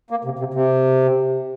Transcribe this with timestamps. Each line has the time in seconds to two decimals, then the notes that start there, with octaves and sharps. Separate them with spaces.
0.10 A#3
0.25 C3
0.39 C3
0.54 C3